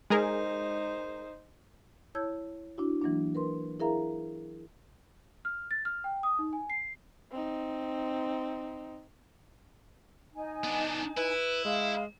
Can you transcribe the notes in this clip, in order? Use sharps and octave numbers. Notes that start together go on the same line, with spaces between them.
G#3 D#4 G#4 A#4 C5
E4 C#5 A5 E6 G6 G#6
D4 E4 F#4
E3 F#3 A#3 D4
A#4 B4 C6
E4 G#4 A#4 E5 F5 A#5
F6
A6
F6
G5
D#6
D#4
G#5
C7
C4 D#4
D#4 G#5
B3 D4
E4 B4
G#3 F5